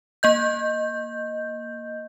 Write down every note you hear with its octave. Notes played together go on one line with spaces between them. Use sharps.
A#3 D#5 G6